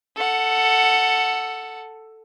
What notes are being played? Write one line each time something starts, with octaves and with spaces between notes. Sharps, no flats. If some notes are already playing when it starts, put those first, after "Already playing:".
A4 F#5